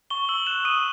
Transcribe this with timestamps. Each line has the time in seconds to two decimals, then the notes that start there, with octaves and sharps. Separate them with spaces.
0.10 C#6 G7
0.29 E6 F#7
0.47 F#6 E7
0.65 D#6 D#7